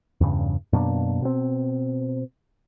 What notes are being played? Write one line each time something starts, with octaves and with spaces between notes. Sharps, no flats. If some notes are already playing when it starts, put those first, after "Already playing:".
E2 G2 C#3
F#2 B2 A#3 D4
B2 C4